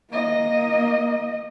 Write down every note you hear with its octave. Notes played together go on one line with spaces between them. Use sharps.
A#3 D#5